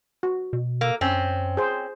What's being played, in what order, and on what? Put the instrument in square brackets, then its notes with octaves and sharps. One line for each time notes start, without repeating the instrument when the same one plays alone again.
[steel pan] F#4
[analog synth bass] B2
[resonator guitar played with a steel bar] A#3
[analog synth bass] F#2 [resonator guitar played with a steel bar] C4 C#4
[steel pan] G#4 C5